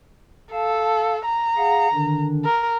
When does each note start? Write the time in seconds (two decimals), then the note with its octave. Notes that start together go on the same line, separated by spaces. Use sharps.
0.52 A4 F5 A5
1.25 A#5
1.57 G#4 F5 F#5
1.93 D3 D#3 D4
2.44 A#4